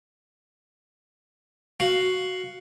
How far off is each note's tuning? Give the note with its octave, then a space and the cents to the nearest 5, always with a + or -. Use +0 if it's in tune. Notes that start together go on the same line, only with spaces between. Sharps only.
F#4 +0 F5 +0